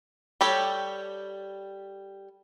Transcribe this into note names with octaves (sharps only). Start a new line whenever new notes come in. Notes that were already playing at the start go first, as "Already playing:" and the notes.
G3 G4 A4 C#5